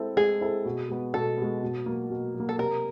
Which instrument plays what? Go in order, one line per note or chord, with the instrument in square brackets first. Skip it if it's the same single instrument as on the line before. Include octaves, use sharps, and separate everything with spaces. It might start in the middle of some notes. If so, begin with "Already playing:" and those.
Already playing: [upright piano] G#3 C4 E4 A4
[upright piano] G#3 [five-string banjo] G#4
[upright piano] C4 E4 A4
B2
G#3 B3
[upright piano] B2 [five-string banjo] A4
[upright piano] G#3 B3
B2
F#3 A#3
B2
F#3
A#3
[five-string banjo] A4
[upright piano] C3 [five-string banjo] A#4